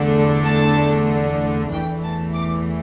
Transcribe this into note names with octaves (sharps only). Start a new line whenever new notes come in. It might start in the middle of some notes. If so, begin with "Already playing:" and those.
Already playing: E2 D3 A3 D4
A5
E2 E3 A3 G5
A5
D6